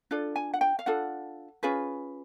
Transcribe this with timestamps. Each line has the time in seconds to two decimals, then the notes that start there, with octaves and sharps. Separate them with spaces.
0.11 D4 F4 A4
0.36 G#5
0.54 F#5
0.61 G5
0.79 F5
0.86 D4 F4 A4 F#5
1.63 C#4 F4 G#4 B4